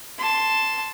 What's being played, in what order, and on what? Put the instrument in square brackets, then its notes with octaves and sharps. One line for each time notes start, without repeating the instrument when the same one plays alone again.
[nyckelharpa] A5 C6